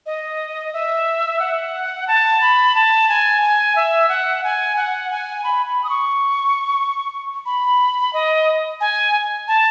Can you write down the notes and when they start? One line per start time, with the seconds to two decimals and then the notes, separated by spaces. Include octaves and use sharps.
0.06 D#5
0.73 E5
1.40 F#5
2.08 A5
2.41 B5
2.75 A5
3.09 G#5
3.42 G#5
3.76 E5
4.09 F#5
4.44 G#5
4.77 F#5
5.11 G#5
5.44 B5
5.66 B5
5.84 D#6
5.89 C#6
7.46 B5
8.13 D#5
8.81 G#5
9.48 A5